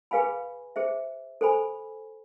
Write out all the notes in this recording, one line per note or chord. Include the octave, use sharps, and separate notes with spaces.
G#4 B4 F5 G#5 B5
G#4 C5 E5
A4 C5 G#5 B5